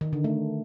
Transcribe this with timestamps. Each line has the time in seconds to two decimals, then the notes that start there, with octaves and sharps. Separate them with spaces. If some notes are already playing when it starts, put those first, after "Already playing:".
0.01 D#3
0.13 D3
0.24 A3